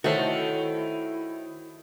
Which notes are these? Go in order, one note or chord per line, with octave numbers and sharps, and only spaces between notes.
D#3 A3 E4 F#4 A4 C5 C#5